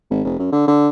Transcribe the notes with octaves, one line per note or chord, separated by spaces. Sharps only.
G#1
F1
F#2
D3
D3